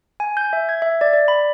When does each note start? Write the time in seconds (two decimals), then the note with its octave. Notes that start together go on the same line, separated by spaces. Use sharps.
0.20 G#5
0.37 G6
0.53 E5
0.69 G#6
0.82 E5
1.01 D5
1.13 D5
1.28 B5